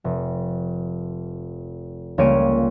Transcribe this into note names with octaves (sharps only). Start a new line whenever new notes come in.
F1
C#2 G3 A#3 C#5 D7 D#7